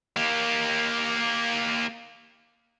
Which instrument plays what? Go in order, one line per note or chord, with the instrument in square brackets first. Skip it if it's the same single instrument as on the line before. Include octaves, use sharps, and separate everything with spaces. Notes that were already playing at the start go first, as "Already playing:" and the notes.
[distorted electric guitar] A#3 G4